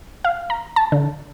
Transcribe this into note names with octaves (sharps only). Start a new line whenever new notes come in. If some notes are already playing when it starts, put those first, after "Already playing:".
F5
A#5
A5
D3